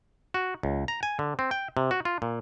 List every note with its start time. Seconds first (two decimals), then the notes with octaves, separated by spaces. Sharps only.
0.34 F#4
0.63 C#2
0.88 A#5
1.03 G#5
1.19 D3
1.39 C4
1.51 G5
1.77 C3
1.91 F#4
2.05 F4
2.22 A#2